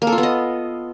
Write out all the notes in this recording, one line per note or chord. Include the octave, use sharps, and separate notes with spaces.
A#3
A4
F4
B3
D#5